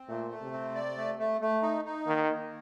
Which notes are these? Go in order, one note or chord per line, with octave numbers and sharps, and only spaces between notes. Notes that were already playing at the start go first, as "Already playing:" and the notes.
Already playing: C4
A#2 A3
A3
C3
C4
D5
A3
A3
A3
D#4
D#4
D#3 A#3
A#3